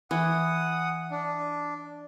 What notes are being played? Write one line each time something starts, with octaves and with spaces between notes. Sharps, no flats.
E3 F#5 D#6
D4